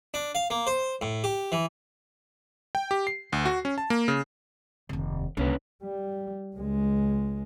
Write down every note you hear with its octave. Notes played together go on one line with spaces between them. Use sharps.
D4
F5
A#3
C5
A2
G4
E3
G5
G4
C7
D2
F#4
C#4
A5
A#3
C#3
F1 D#2
C2 D3 A#3 C#4 B4
G3
C#2 G#3